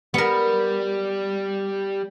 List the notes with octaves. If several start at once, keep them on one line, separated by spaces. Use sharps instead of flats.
G3 B3 A#4